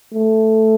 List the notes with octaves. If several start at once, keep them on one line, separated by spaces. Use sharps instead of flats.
A3